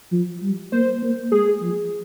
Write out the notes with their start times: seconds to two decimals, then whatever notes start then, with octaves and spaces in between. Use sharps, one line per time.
0.12 F3
0.42 G3
0.72 A#3 C5
1.03 A#3
1.31 G#3 G#4
1.62 F3